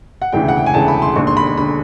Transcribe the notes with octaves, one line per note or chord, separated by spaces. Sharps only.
F#5
E1 D2 C#3 E3 G5
F#5
G5
G#5
E1 D2 C#3 E3 A5
B5
C6
E1 D#2 D3 C#6
C6
B5
B5
D3 B5